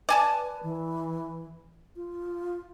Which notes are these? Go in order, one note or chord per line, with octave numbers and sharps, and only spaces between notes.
B4 D5 G#5 A5
E3
F4